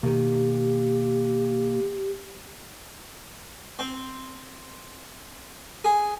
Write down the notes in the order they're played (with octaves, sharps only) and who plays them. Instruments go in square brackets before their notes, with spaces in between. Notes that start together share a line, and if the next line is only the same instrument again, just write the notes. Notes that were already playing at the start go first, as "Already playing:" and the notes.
[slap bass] B2 D#3 [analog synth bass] A#3 [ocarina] G4
[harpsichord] C4
G#4